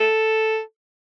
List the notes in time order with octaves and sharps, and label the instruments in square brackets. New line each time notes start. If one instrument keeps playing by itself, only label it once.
[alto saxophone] A4